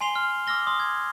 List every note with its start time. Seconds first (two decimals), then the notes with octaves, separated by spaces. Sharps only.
0.01 G#5 C6 C7 F7 G7
0.16 F6
0.47 D6 E6 F6 A#6 G7
0.67 C6 D#6
0.80 G#6